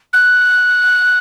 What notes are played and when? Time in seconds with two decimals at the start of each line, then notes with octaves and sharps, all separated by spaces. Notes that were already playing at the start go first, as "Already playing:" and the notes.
0.13 F#6